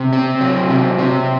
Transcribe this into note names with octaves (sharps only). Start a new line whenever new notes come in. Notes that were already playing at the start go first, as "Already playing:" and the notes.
Already playing: C3
C4
F#3
C3
C3